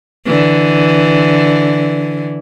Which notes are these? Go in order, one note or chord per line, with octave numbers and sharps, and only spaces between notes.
D3 E3